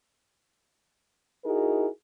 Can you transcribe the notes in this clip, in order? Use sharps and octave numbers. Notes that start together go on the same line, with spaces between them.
D#4 E4 F#4 G#4 A#4